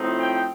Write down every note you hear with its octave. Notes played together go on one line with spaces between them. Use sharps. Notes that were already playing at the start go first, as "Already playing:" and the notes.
Already playing: A2 F3 C4 D#4
G5